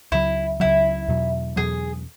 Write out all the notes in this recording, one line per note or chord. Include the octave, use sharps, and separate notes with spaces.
C#2 C#3 F#3 E4
C#2 C#3 F#3 E4
E2 B2 F#3
E2 B2 F#3 G#4